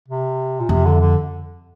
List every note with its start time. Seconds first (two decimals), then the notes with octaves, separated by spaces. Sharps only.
0.08 C3
0.60 A#2
0.69 F2 C3
0.85 D3
1.01 D3